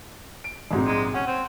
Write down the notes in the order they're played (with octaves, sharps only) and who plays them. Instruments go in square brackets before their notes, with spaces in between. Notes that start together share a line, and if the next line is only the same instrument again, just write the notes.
[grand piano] D7
A#1 G#2 C3
[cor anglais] G#3
[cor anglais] C#4 [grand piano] F#5
[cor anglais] C4